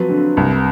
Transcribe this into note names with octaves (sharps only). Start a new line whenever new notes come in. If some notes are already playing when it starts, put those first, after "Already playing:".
Already playing: F3 F#3 C4 B4
D3
C2